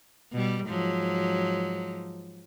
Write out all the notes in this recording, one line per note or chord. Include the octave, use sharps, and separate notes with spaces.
B2 G3
G#2 F3 F#3